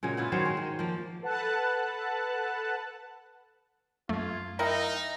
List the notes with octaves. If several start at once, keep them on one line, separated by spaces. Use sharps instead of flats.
A#2 C#3 F#3 G#3
B3 E4 F4
D#3 F#3 C5 C#5
G#3
D#3
F3 A#3
A4 B4 F#5 A5 F#6
F#2 A3 F4 G#6
D#4 E4 A#4 F5 G5 A#5